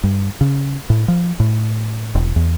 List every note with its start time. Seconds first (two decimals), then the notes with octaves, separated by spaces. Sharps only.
0.04 G2
0.41 C#3
0.90 A2
1.08 F3
1.40 A2
2.15 E1
2.36 E2